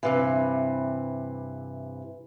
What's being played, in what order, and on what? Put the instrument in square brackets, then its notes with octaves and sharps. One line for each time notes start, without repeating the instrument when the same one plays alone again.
[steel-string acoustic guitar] G2 C3 E3